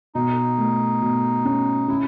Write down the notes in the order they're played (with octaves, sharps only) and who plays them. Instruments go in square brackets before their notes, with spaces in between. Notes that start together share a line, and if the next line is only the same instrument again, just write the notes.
[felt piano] B2 [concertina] D#4
[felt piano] A3
B2
C#4
[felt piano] C#4 [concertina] E4